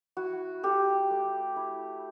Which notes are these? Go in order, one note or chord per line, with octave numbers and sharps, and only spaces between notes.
E4 F#4
A3 G4
A3
E4